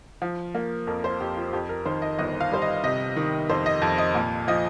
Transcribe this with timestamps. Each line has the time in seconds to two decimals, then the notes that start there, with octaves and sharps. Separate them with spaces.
0.22 F3
0.55 A#3
0.87 F2 A#4
1.04 C5
1.20 F2 G4
1.37 F4
1.53 F2 G4
1.69 A#4
1.86 D#3 C5
2.02 D#5
2.19 G1 D#5
2.40 F5
2.52 G3 C5
2.62 D#5
2.84 C3 D#5
3.16 D#3
3.49 F2 C5
3.66 D#5
3.82 F2
3.98 D#5
4.15 A#2
4.48 F3 D#5